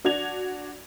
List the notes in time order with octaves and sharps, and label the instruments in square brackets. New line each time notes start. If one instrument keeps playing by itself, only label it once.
[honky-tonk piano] D4 F#4 D5 G#6 F7